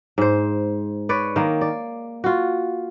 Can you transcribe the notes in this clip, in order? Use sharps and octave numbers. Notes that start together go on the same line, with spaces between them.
G#2 C5
B4 C#5 D5
D#3 A#3
D5
F4 F#4